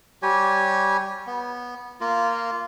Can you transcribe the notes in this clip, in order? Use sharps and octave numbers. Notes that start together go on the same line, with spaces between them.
G3 G4 C#5 G#5
B3
A#3 F4